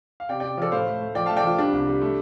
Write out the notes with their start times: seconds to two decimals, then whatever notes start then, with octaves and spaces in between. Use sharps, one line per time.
0.20 F5
0.29 C3 D5 G5
0.40 D5 G5
0.44 C3
0.57 F3 A4 D5
0.72 A2 C5 F5
0.87 A3
1.01 A3
1.15 F3 D5 G5
1.26 F5 A5
1.30 A3
1.37 D5 G5
1.44 F3 F4
1.58 G3 D4
1.72 C2
1.87 G3
2.02 A3